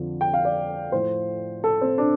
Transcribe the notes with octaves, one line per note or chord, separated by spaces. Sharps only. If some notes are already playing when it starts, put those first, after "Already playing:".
Already playing: F2 D3 F3
G5
F5
D5
A2 F3 C5
A4
C4
D4